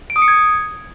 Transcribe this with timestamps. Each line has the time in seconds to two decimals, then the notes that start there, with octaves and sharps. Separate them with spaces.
0.10 D7
0.16 D#6
0.22 C#7
0.28 G#6